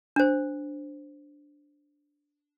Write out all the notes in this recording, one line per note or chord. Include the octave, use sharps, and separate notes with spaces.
D4 C5